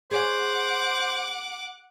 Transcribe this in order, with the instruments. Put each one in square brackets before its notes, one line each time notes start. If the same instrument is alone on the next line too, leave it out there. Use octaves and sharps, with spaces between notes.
[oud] G#4 C#5 [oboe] C5 [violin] F#5 D6